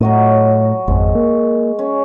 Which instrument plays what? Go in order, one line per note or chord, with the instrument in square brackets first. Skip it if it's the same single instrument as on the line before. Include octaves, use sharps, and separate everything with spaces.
[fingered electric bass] A2 [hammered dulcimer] F#3 F#4 D#5
[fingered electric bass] G#1 F2 [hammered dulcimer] G#3
[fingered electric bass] A#3
[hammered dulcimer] C#4